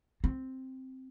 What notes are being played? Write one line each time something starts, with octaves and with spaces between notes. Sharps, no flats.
C4